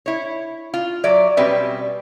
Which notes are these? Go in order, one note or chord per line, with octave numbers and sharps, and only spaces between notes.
E4 C#5
F4
F#3 D5 E5
B2 G3 C4 C#4 B4 E5